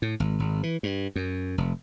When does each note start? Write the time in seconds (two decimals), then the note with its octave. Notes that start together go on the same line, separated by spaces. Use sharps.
0.02 A2
0.20 G#1
0.40 G#1
0.63 E3
0.83 G2
1.16 F#2
1.58 F1